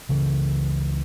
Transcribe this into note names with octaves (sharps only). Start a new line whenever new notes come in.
C#2 C#3 E3